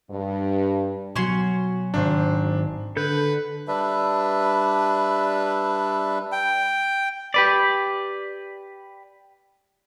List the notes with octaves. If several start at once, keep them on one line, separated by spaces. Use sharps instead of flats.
G2
B2 F#3 C#4 F#4 C6 G#6
G#1 D#3 D4 C5
D3 A4 B4 G6
G3 D4 B4 E5
G5
G4 B4 D5